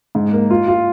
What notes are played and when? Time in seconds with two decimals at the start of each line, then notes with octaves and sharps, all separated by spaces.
0.15 G#2
0.33 A#3
0.50 F4
0.68 F4